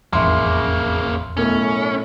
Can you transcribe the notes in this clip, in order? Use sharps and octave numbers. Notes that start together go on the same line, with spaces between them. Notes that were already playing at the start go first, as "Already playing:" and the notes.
E1 A1 F2 C#3 A#3 E5 C6
B1 F#2 A2 C#4